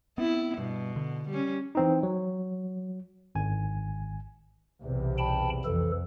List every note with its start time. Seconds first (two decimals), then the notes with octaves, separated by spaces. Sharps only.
0.18 B3 C4 E4
0.58 G2 B2
0.96 D3
1.29 G3 C#4
1.75 E3 C4 D#4
2.03 F#3
3.35 G#1 G#5
4.81 B1 E2 C3
5.18 G5 A5 B5
5.65 F2 E3 A4